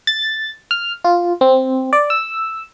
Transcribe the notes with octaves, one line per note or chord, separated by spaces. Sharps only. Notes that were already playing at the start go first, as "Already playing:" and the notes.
A6
F6
F4
C4
D5
E6